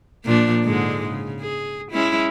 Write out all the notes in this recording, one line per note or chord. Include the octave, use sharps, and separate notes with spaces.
A#2 F3 D4
G#2 D3 G#3
C#3
G#4
G#3 C#4 E4